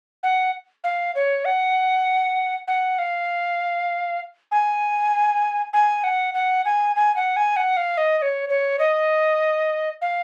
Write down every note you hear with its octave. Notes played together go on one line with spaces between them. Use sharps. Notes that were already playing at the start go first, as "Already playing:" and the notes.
F#5
F5
C#5
F#5
F#5
F5
G#5
G#5
F#5
F#5
G#5
G#5
F#5
G#5
F#5
F5
D#5
D#5
C#5
C#5
D#5
F5